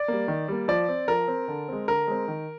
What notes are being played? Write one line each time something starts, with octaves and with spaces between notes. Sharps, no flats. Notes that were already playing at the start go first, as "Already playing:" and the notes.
Already playing: D5
G3 A#3
D#3
G3 A#3
F3 D5
C4
F3 A#4
C4
D3
G#3 C4
D3 A#4
G#3 C4
D#3